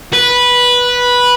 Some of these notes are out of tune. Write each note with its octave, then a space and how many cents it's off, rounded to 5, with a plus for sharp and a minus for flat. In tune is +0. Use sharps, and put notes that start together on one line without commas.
B4 -10